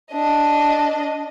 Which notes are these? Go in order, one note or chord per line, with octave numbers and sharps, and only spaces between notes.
D4 D#5